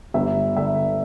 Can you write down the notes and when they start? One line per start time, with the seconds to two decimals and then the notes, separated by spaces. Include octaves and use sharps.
0.14 G1 E5
0.57 D3 E5